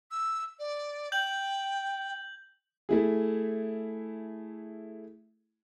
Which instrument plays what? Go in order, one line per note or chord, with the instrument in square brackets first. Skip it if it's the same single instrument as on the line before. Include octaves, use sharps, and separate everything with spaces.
[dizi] E6
D5
[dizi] G5 [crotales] G6 F#7
[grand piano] A3 E4 G#4